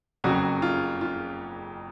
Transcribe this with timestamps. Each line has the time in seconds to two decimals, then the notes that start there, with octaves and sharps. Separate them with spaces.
0.24 F#1 F2 C#3 F#3 F#4
0.62 F4
1.01 F4